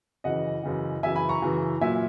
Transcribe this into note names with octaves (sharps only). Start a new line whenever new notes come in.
F#2 C#3 E3 D#5 F#5
F#2 C#3 E3
F#2 C#3 E3 E5 G#5
G#5 B5
A#5 C#6
F#2 C#3 E3
A#2 F#3 E5 G#5